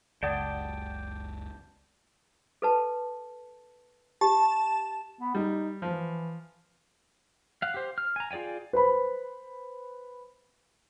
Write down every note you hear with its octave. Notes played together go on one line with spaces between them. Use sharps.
F#1 C#2 D5 F#5 G5 A5 D6 D#6
A4 B4 A5
G4 A5
B3
G3 D#4
E3 F3
F5 F#5
G4 C5
F6
G#5 A#5
F4 G#4 D5 G5 G#5
B4 C5 B5